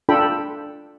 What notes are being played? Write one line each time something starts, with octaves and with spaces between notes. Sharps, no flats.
D4 F4 A4 G5 B5